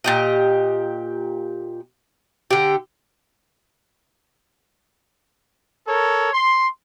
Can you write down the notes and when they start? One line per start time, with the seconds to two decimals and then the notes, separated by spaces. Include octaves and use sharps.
0.04 A#2 G4 D#5
2.51 D3 G4
5.87 A4 A#4 C#5
6.33 C6